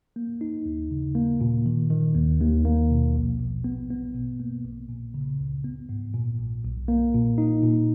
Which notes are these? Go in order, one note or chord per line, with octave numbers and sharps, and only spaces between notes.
A#3
D#4
D#2
C#3
A#3
A#2
D#3
D#3
D#2
D#2
A#3
B2
A#1
A#1
B3
B3
B2
A#3
A#1
A#2
C#3
C#2
B3
G#2
A#2
A#1
B1
A#3
A#2
D#4
A#2